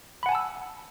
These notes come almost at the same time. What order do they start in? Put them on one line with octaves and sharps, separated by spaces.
B5 F#5 G#5 A5 E6